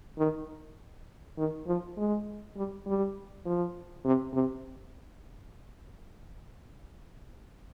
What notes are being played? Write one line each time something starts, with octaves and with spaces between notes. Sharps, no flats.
D#3
D#3
F3
G#3
G3
G3
F3
C3
C3